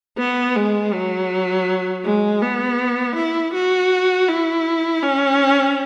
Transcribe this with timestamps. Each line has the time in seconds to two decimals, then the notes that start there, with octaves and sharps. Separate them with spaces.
0.18 B3
0.56 G#3
0.93 F#3
2.04 G#3
2.42 B3
3.16 E4
3.54 F#4
4.28 E4
5.03 C#4